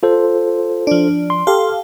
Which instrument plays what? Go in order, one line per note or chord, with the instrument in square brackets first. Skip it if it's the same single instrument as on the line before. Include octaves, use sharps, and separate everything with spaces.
[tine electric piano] F4 A4 C5
[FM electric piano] F3 D4
[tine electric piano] C6
[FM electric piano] G4 A4 F5